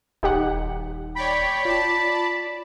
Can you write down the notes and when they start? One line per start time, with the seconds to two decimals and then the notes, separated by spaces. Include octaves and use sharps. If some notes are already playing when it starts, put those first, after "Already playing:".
0.23 D#1 D#4 G4 F#5
1.16 C#5 D5 G5 B5
1.65 F4 D5 A5